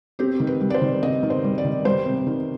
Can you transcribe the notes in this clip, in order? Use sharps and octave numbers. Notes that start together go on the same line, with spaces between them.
C4 G4
D#3
B4
G3
D5
C5
D#3
C4 D#5
D#3
C5
G3
D5
D#3
G3 C5
C3
D#3